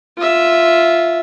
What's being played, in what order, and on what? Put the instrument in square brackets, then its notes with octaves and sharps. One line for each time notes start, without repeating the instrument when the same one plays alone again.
[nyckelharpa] F4 E5